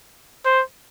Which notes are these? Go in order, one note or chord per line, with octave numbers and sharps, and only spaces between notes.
C5